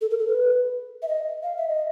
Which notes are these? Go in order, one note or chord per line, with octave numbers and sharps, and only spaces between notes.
A4
A#4
A4
B4
E5
D#5
F5
E5
D#5